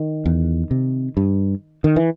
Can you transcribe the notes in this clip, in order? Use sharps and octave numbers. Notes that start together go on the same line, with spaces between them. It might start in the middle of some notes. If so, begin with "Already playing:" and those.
Already playing: D#3
E2
C3
G2
D#3
E3